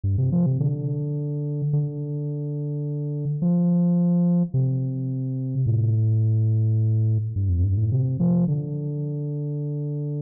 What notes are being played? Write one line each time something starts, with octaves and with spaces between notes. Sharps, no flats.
G2
C3
F3
C3
D3
D3
F3
C3
A2
G2
F2
G2
A2
C3
F3
D3